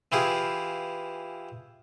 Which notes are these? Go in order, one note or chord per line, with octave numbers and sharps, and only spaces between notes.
E3 E4 F4 G4 G#4